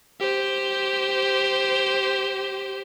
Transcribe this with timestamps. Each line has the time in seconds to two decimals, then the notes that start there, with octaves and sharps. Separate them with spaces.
0.20 G4 C5